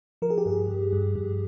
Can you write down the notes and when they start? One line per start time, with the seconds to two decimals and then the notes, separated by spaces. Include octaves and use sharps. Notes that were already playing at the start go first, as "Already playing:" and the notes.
0.22 F3 A#4
0.30 G#4
0.38 G4
0.46 G2 G#4
0.68 G2
0.93 G2
1.16 G2